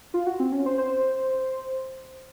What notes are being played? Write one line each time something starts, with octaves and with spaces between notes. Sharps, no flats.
F4
F#4
C4
C#4
C5
C5